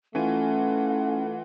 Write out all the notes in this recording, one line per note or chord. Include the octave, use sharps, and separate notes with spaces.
E3 A3 C#4 F4 F#5 G#5